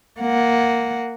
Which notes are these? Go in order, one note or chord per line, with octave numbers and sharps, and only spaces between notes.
A#3 F#5